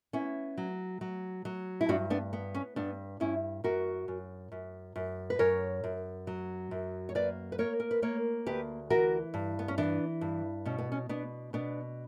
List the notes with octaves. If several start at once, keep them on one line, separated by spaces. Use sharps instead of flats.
B3 C#4 E4
F#3
F#3
F#3
E4
G2 D4 F#4
B3 D4
B3
C#4
G2 B3 D4
G2 C#4 E4
F#2 F#4 A#4
F#2
F#2
F#2
B4
F#2 A#4 C#5
F#2
F#3
F#2
C#5
A#3 B4 D5
B4
A#3 A#4 C#5
A#4
B4
A#3 A#4 C#5
D2 G4 B4
E3 F#4 A#4
G2
B3
C#4
E3 B3 D4
G2
B2 C#4
B3
C#4
B2 B3 D4
B2 B3 D4